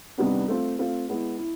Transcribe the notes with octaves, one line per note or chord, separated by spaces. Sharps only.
C3 D#3 G3 B3 D4
A3 C4 F4
A3 C4 F4
G#3 B3 E4
E4